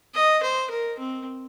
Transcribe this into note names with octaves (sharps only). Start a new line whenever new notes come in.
D#5
C5
A#4
C4